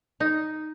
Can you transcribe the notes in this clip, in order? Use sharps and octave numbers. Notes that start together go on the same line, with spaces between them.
D#4